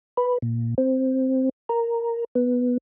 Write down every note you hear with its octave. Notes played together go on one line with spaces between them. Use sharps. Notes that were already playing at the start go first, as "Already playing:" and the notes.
B4
A#2
C4
A#4
B3